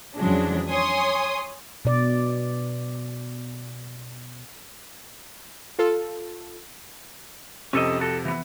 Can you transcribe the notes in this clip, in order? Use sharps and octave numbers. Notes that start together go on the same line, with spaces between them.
F2 C#3 E3 F#3 G#3 D4
C#5 G#5 C6 D#6
B2 D5
F4 A4
F2 C3 C#4 A4 D#5
F#4 A4
E3 B3